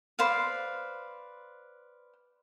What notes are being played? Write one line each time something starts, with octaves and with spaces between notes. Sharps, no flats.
B4 C5 D5 F5